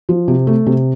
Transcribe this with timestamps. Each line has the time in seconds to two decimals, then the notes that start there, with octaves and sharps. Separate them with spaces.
0.09 F3
0.28 C3
0.47 A3
0.67 C3